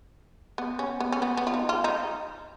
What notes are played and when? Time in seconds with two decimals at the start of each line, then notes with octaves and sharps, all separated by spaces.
0.58 B3
0.79 C#4
1.00 B3
1.12 C#4
1.22 B3
1.37 B3
1.47 F4
1.54 D#4
1.69 F4
1.84 D#4